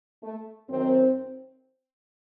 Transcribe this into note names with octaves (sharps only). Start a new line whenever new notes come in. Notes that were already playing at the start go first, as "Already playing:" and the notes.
A3
F#2 D#3 C4